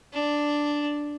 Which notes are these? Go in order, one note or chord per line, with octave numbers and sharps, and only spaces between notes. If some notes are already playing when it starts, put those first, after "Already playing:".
D4